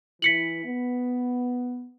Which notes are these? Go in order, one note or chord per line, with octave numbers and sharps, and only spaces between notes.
E3 E4 B6 C#7 F#7
B3